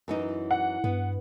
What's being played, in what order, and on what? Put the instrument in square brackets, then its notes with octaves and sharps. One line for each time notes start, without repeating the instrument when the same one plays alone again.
[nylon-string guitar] F#2 E3 D#4
[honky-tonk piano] F#5
[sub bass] G2 [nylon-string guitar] B3